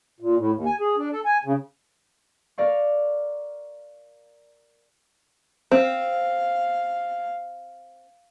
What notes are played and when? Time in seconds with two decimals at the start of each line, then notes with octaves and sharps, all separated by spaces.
0.20 A#2
0.38 A2
0.53 D#2
0.66 G#5
0.80 G#4
0.97 D4
1.12 A4
1.25 G#5
1.45 C#3
2.58 A#4 D5 F5 C#6
5.72 C4 F5